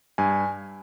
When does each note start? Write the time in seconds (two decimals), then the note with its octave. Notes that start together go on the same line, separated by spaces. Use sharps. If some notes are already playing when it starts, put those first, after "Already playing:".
0.18 G2 G#5